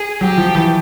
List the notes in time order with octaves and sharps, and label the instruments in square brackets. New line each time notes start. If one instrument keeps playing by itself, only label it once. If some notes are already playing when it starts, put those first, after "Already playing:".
Already playing: [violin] G#4
[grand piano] F#3 [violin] G4
[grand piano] F3
E3